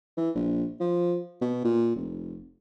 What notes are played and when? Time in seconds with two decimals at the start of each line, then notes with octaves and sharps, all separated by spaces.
0.17 E3
0.35 A#1
0.80 F3
1.41 B2
1.64 A#2
1.96 F1